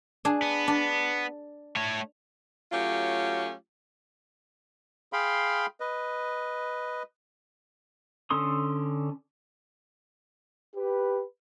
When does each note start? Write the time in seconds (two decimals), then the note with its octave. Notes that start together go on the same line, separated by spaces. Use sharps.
0.25 D4 G#4
0.42 B3
0.68 D4
1.76 A3 C#5
2.72 F#3 A3 C#4 F4 G4
5.13 G#4 F5 G5 B5 C6
5.80 B4 D#5
8.30 D3 C#4 A4 C6 D#6
10.76 G4 B4